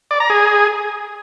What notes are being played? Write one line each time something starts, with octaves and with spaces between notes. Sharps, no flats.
D5
A#5
G#4